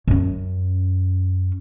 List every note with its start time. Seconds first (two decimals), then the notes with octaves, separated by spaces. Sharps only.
0.08 F#2 C#4